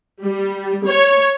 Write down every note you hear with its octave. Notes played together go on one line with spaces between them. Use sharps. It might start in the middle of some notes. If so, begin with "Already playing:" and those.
G3
C#5